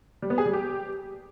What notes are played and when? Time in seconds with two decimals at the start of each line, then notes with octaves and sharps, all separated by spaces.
0.22 G3
0.30 B3
0.38 G#4
0.46 G3
0.53 G4